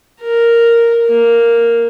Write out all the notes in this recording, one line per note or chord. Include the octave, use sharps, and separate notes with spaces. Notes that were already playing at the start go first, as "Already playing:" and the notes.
A#4
A#3